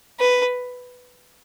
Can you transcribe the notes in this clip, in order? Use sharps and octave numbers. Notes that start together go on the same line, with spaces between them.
B4